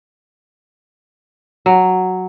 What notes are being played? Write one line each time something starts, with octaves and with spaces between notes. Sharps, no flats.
F#3